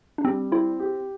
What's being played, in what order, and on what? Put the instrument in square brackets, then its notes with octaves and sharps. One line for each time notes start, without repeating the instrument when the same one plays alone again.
[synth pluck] D4
[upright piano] G3 [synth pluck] C4
[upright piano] C4 [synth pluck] E4
[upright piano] G4